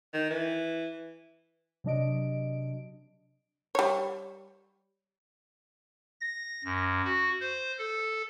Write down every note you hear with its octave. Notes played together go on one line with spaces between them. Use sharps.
D#3
E3
C3 F#3 D4 D#5 D7
G3 C#5
A#6
F#2
F#4
C5
A4